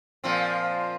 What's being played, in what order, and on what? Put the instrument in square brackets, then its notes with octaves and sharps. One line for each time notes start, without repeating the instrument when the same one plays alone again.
[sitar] A#2 F3 C4